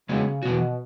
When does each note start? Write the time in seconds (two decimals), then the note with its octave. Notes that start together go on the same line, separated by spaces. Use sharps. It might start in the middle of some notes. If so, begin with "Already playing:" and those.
0.09 C#3 G#3 B3 F#4
0.43 B2 E3 B3 F#4